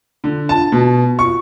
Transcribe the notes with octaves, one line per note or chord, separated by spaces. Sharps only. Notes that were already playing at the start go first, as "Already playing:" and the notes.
D3
A5
B2
C#6